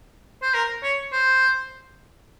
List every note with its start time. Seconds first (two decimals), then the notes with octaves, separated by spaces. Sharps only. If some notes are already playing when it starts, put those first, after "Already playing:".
0.42 C5
0.54 A#4
0.83 C#5
1.13 C5